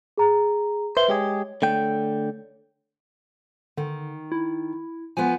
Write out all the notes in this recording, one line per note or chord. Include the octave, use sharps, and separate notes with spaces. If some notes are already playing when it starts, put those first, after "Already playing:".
G#4 A#5
B4 C5 E5 G7
G#3 G4 G#4 C#5
D3 A3 G5
D3 D#3
E4
F3 B3 G#5